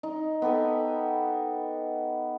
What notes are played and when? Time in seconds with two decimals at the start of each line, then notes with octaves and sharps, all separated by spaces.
0.03 D#4
0.42 B3 G4 A4